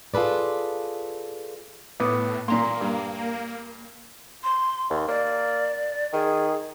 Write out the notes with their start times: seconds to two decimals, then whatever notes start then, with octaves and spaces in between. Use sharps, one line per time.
0.14 F4 G#4 A4 B4 D5
2.00 A2 B3 D6 D#6
2.48 A#2 A#3 A#5 C6
2.81 G2
4.44 C6
4.90 D#2
5.08 A#3 D5
6.13 D#3 G#4